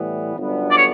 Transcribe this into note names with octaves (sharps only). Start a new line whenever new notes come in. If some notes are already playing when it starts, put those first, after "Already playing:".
Already playing: A2 E3 G3 B3
G1 F#2 D3 G3 B3
D5
C#5